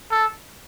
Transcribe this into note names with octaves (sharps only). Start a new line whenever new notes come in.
A4